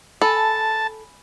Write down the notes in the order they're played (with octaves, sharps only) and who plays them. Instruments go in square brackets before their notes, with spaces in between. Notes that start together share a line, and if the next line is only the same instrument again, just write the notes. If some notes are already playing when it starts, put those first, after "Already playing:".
[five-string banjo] A4 [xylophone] G#5 B5 [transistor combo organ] A5